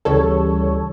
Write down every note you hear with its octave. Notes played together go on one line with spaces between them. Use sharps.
D2 C#3 E3 G3 A4 C#5